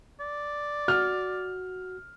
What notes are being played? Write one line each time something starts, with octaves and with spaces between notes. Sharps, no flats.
D5
F#4 F6